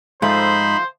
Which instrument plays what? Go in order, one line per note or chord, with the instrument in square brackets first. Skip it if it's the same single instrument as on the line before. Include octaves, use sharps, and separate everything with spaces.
[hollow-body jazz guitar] G#2 [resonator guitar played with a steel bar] F3 A3 F4 [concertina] D#4 B5 [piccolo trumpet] C5